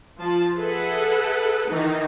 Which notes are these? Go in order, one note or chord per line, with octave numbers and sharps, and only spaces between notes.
F3 A5
G#4 A4 B4 E5 F#5
D#3 E3 D#4